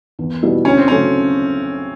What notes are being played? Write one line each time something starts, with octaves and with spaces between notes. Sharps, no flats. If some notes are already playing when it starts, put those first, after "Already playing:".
E2
B2 G3 B3 E4
D2 C#4
C4
C#3 F#3 A3 C#4